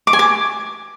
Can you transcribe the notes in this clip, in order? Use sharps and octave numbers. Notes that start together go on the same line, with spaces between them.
D6
G#5
D6